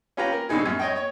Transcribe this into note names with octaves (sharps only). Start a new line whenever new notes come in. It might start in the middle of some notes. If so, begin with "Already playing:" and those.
C#4 F4 G4 B4 A#5
A#4
C2 D3 B3 D#4 G#4
F#2
C#5 D#5 G5
C#5